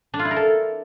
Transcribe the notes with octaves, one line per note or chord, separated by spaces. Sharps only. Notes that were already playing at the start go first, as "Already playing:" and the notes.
D4
F4
E4
A#4
A4